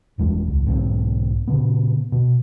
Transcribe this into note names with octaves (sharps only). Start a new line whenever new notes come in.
F#1 E2 G3 G#3
G#1 C#2
B1 G#2 F#3 C4
A#2 C#3 B3
B2